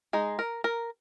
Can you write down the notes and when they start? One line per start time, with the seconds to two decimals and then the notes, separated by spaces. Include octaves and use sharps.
0.13 G#3 D#4 G#4
0.39 A#4
0.64 A#4